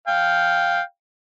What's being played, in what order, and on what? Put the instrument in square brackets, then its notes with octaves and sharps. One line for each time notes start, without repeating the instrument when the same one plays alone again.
[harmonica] F5 G5